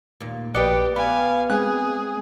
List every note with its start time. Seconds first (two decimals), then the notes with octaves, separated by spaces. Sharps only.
0.20 D#2 A#2
0.54 A#1 G4 B4 D5 D#5 G5 F#6 C#7
0.96 B3 F5 G#5 B5
1.50 G#3 C4 G#4 G#5 F#6